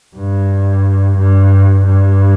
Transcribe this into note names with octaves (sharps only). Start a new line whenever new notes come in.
G2
G2
G2